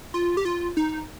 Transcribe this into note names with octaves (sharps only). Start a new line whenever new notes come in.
F4
G4
F4
D#4